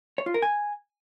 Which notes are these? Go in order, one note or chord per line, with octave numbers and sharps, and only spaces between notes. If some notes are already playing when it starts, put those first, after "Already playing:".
C#5
F4
A#4
G#5